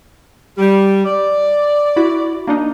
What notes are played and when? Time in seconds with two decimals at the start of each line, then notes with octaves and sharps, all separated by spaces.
0.58 G3
1.05 D5
1.96 E4 F#4 B5
2.47 A#3 D4 D#4